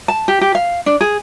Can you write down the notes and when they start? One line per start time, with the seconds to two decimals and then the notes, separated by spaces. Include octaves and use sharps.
0.08 A5
0.28 G4
0.41 G4
0.55 F5
0.86 D4
1.01 G#4